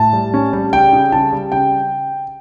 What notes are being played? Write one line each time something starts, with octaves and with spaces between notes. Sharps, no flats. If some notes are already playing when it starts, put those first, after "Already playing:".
Already playing: A2 A5
G3
C#4
G3
C#3 G5
C#3
C#3 A5
G3
C#3 G5